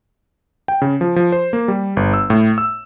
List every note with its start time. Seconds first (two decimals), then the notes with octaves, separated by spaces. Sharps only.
0.68 G5
0.82 C#3
1.01 F3
1.16 F3
1.32 C5
1.53 A#3
1.68 G3
1.97 G1
2.14 E6
2.30 A2
2.58 E6